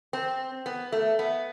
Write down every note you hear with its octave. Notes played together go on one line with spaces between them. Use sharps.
C4
B3
A3
B3